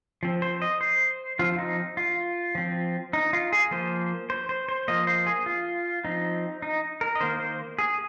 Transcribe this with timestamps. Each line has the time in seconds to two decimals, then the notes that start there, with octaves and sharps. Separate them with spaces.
0.23 F3 C4
0.42 C5
0.62 D#5
0.81 C5
1.39 F3 C4 F4
1.58 D#4
1.97 F4
2.55 F3 C4
3.13 D#4
3.33 F4
3.52 G#4
3.71 F3 A#3 C5
4.30 C5
4.49 C5
4.69 C5
4.88 F3 A#3 D#5
5.07 C5
5.26 G#4
5.46 F4
6.05 F3 C4 D#4
6.62 D#4
7.01 A#4
7.15 D#5
7.20 D#3 A#3 C5
7.40 C5
7.79 G#4